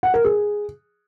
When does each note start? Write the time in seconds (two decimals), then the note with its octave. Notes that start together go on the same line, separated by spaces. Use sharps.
0.03 F#5
0.14 A#4
0.25 G#4